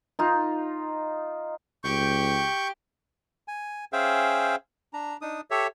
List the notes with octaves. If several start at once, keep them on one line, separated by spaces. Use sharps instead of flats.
D#4 F4
C#2 G4 G5 C#6 G6
G#5
C#4 G#4 C5 E5 F5 G5
D4 A#5
D4 D#4 D#6
G4 A4 C#5 E5